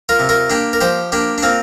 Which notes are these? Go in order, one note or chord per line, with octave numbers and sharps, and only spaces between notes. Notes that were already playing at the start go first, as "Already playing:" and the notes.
F4 A#4
C3
F4 A#4
A#3 D4 G4
A#4
F3 G4 C5
A#3 D4 G4
D4
A#3 C4 F4